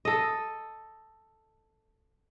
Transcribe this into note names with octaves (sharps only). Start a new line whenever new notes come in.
A4 D#5